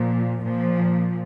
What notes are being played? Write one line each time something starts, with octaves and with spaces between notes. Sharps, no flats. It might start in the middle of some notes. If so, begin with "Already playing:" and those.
Already playing: A#2 F3
A#2 F3